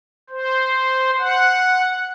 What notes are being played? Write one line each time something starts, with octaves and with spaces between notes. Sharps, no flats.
C5
F#5